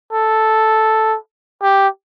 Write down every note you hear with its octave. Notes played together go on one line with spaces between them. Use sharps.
A4
G4